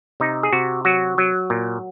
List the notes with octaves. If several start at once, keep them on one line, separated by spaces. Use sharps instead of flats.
C3 D#4
G#4
C3 F#4
F#3 F#4
F#3
A#2